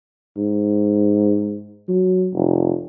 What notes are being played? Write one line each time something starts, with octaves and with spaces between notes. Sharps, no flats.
G#2
F#3
F1